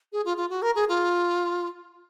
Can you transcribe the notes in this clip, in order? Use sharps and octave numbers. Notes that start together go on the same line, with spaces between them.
G#4
F4
F4
F#4
A#4
G#4
F4